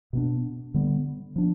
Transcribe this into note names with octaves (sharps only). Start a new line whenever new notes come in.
B2 B3 D4
D3 G3 B3
F3 B3 D4